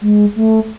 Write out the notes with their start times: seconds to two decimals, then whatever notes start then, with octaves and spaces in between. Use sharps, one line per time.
0.02 G#3
0.36 A3